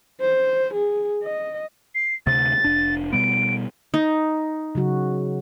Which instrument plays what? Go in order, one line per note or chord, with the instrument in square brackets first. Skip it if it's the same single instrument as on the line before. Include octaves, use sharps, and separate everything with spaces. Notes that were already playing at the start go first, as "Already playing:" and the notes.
[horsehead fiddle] C5
G#4
D#5
[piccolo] C7
[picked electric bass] D2 C3 [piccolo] A6
[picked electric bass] F1 D4
[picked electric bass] B2 G3 B3 [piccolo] D7
[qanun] D#4
[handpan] C#3 F#3 F#4